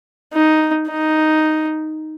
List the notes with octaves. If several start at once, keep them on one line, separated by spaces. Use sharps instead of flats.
D#4
D#4